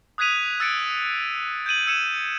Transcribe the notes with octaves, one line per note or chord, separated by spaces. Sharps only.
D#6 F#6 G#6 B6 D#7 F7
E6 A6 C#7 D7
G6 G#6 D#7 F#7
E6 G#6 C#7 D#7 E7